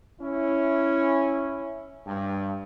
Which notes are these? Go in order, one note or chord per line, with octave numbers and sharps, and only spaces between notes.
C#4 E4
G2